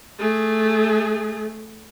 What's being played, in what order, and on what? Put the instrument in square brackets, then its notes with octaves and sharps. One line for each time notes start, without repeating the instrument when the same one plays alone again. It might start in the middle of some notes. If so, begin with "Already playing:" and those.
[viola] A3 G#4